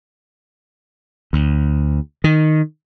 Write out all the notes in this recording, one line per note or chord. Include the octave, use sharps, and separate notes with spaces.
D2
D#3